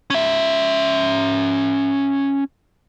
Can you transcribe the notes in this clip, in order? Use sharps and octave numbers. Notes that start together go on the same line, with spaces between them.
C#4 E5